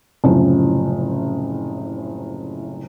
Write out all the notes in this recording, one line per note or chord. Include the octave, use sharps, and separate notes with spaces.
F#1 C2 A2 C#3 F3